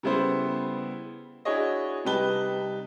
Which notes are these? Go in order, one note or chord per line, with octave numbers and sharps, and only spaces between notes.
C#3 G3 B3 E4 A4 C5
D4 E4 F#4 G#4 C#5 D#5
C3 G3 D#4 B4 A5 G7